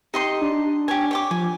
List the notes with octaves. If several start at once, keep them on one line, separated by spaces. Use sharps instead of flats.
D#4 G4 D#5 C6
D4
G4 C#5 G#5
C#5 G5 D6
F3 G#5